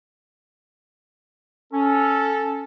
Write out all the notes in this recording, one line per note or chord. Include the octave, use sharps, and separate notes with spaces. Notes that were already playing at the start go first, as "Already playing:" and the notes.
C#4 A4